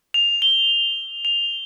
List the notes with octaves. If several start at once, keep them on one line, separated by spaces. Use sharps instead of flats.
F7
G7
F7